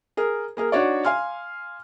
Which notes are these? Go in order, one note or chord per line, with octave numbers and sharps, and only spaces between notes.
G#4 A#4
A#3 G#4 A#4
D4 D#4 F#4 C#5 D5
F5 G#5 C6 F6